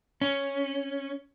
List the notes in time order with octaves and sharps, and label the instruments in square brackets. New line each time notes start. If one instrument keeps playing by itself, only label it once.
[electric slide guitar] C#4